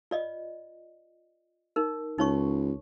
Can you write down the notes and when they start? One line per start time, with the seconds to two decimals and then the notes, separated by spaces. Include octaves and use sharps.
0.11 F4 D5 D#5
1.76 D#4 A#4
2.18 C#2 D#4 C#5 C#6